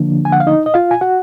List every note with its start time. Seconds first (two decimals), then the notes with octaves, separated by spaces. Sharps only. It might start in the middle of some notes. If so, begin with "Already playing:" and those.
Already playing: D3 F3 A#3 D4
0.25 G#5
0.32 F#5
0.40 F5
0.47 D#4 D#5
0.66 D#5
0.74 F4 F5
0.91 G#5
1.01 F#4 F#5